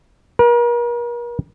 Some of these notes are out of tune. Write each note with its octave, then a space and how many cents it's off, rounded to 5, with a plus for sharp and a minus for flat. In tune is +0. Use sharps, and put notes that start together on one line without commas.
A#4 +40